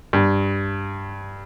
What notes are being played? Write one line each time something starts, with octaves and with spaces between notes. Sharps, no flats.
G2